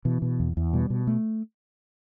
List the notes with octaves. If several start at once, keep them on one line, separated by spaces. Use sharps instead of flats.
B2 E3
B2
E2
E2
B2 G3
B2
A3